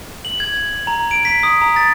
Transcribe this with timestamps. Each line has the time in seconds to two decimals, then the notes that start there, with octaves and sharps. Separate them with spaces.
0.25 F#7
0.40 G#6
0.87 A#5
1.11 D7
1.25 B6
1.43 D#6
1.62 A#5
1.76 A6